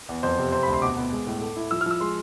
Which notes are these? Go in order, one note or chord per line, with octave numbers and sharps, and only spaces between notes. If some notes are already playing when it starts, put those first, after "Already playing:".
E2
F2 C5
C3
C3 C5
B5
D2
C6
B2 D6
B3
G#3
A2
A3
E4
F3 E6
F6
F3 E6
G#3 C6